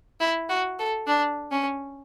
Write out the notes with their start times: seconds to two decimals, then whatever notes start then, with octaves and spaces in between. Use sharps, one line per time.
0.20 E4
0.49 F#4
0.79 A4
1.07 D4
1.52 C#4